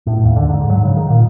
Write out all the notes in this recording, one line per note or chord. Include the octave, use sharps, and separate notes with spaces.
A2
D#2
D3
G#2
F#3
C#3
D#3
A#2